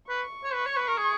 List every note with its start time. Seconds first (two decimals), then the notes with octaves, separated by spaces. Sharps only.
0.09 B4 C#6
0.44 C#5
0.53 B4
0.66 C#5
0.77 B4
0.88 A#4
0.97 G#4